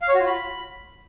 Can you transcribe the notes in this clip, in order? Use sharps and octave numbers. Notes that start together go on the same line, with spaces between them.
F5
C#5
F#4
F4
B5